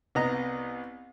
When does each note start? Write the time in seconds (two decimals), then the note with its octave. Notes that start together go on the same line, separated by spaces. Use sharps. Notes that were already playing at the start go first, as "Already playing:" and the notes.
0.15 C2 B3 D#5 A#5